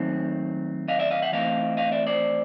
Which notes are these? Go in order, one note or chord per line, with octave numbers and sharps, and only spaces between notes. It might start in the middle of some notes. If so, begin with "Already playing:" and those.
Already playing: D#3 F#3 A3 C4
D#5 F5
D5 E5
D#5 F5
E5 F#5
E3 A3 C4 D#5 F5
D#5 F5
D5 E5
C5 D5